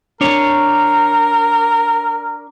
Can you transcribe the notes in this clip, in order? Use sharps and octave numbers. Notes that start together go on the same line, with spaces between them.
D4 A#4 C#5